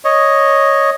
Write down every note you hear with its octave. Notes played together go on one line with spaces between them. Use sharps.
C#5 D#5